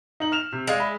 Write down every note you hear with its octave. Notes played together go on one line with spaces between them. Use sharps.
D#4 F#7
F6 E7 F7
C3
G#3 D5 F5
E5 B5